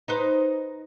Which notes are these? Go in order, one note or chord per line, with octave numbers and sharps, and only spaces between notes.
D#4 B4 C5